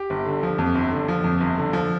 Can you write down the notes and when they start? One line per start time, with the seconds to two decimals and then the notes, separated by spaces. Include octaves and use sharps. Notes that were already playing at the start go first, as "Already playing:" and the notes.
Already playing: G4
0.10 G1
0.26 D3
0.43 F3
0.58 F2
0.75 G1
0.91 D3
1.08 F3
1.24 F2
1.40 G1
1.58 D3
1.73 F3